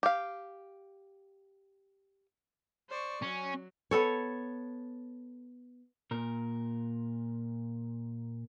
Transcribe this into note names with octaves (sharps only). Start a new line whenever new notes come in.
G4 F5
C5 D5 C#6
F#3 C#4
B3 A4 C#5
A#2 A#4